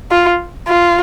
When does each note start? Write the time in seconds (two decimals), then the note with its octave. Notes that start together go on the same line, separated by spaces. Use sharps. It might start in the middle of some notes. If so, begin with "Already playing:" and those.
0.11 F4
0.68 F4